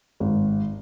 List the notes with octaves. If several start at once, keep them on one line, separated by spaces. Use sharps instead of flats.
G#1